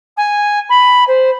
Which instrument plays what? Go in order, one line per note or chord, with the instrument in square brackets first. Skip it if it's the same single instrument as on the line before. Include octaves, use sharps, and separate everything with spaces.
[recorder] G#5
B5
C5